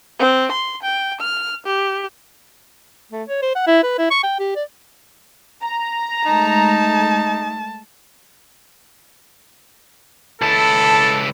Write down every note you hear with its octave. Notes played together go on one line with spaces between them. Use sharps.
C4
C6
G5
F6
G4
A3
C#5
C5
F#5
E4
B4
E4
C#6
G5
G4
D5
A#5
G#3 A3 D#4 A5
C#2 E4 A4 A5